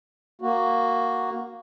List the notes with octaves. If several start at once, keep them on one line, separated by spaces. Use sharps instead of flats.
A#3 F#4